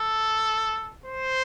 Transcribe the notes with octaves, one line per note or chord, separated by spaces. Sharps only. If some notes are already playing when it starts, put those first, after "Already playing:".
Already playing: A4
C5